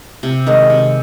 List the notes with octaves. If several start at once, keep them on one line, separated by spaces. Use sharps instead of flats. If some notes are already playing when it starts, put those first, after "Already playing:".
C3
D#3 G#3 D#4
C3